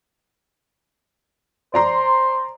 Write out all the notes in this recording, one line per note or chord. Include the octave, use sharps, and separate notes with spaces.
C5 D5 A#5 C6